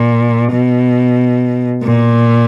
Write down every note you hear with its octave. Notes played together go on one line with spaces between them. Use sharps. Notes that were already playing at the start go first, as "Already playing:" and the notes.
Already playing: A#2
B2
A#2